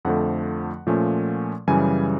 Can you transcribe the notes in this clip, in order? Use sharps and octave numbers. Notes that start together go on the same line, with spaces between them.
F2 D3 F3 A3 F#5
A#2 F3 A3 C#4
F#2 C#3 E3 G3 G#5